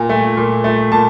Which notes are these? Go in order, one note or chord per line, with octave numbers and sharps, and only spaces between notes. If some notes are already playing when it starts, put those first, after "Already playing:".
Already playing: A#2
A3
A#2
A3
A#2 A5